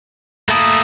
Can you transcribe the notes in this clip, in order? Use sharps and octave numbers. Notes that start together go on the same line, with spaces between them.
A3 A#3 E4 A5 D#6